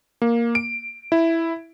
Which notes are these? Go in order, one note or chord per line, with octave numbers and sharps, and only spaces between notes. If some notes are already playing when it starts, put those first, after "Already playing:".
A#3
D7
E4